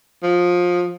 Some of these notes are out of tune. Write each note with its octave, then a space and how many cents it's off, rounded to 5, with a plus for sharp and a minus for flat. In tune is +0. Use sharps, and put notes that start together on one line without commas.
F3 +20